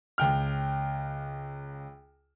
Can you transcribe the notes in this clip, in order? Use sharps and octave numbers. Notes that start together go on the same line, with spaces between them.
C#2 G5 F6